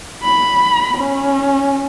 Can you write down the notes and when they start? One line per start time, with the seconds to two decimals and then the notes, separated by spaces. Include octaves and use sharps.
0.23 B5
0.97 C#4